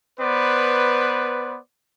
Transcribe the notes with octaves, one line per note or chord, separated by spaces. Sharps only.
B3 B4 C5 D5